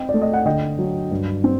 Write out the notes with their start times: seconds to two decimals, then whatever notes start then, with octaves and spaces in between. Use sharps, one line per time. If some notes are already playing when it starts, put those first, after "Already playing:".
Already playing: C4 D#5 G5
0.09 A3 D5
0.22 D#5
0.34 F#5
0.45 D3 D#5 G5
0.79 F#3
1.11 G2
1.44 C4